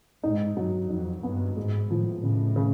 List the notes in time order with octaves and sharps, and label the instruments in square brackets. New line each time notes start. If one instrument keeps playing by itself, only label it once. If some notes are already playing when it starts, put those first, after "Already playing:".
[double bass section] G#2 [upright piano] D#4
[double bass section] G2 [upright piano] F#3
[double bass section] F2 [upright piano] D#4
[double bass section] G2 [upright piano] B3
[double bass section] G#2 [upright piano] G#3
[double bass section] A2 [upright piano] F3
[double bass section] A2 [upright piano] C#3
[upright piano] C#3